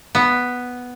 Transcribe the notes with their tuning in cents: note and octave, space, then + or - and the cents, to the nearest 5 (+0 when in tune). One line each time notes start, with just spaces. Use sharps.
B3 +0